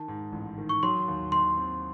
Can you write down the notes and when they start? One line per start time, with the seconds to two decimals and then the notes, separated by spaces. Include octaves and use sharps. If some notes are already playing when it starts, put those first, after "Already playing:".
Already playing: D#3 A5
0.08 G#2
0.32 A1
0.58 D#3
0.69 C#6
0.83 F#3 C6
1.08 D#2
1.32 D#2 C6
1.57 C4